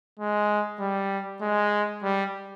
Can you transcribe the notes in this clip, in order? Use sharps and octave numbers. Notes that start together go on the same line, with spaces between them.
G#3
G3
G#3
G3